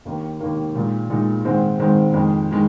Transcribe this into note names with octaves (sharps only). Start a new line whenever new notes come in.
D#2 D#3 A#3
D#2 D#3 A#3
A#2 G#3 D#4
A#2 G#3 D#4
G#2 D#3 G#3 C4
G#2 D#3 G#3 C4
F2 D#3 G#3
D#3 G#3